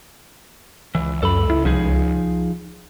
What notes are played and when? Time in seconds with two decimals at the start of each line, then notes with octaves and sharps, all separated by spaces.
0.95 C#2 E3
1.23 F#2 A4 B5
1.50 E4
1.65 C2 F3 D#4 G#4